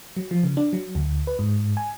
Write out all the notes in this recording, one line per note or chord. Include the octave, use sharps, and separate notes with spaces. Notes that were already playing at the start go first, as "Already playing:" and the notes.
F#3
F3
C#3
D4
F#3
D2
B4
G#2
G#5